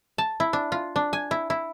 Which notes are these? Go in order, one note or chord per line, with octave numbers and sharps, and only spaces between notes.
A5
E4
D4
F4
D4
G#5
E4
E4